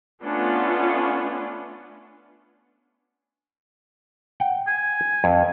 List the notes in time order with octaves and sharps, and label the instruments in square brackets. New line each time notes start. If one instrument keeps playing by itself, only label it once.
[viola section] A3 B3 C#4 D4 F4
[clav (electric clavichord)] F#5 G5
[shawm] G#5
[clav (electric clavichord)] F2